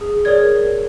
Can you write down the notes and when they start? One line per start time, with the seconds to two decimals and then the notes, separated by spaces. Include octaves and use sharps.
0.01 G#4
0.25 G#4 A#4 C#5 D5 G#6